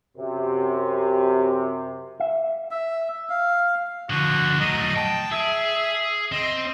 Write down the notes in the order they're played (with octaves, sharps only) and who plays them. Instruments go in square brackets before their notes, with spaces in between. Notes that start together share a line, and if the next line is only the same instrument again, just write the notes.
[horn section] F#2 C3
[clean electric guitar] E5
[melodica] E5
F5
[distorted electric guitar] D3 F3 [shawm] F#4
[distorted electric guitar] F#3 A3 [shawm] D#5
[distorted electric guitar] G5 [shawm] A5
[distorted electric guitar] G#4 [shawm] E5
[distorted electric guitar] C4 [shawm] D#5